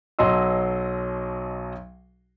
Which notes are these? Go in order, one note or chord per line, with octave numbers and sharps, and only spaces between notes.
B1 B2 F#3 D#5 C6 E6